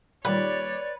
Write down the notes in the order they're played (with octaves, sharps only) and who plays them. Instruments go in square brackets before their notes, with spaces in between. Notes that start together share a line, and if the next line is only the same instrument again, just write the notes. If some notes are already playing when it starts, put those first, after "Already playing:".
[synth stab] A#2 D#3 G3 [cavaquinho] B4 [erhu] C#5 [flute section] D5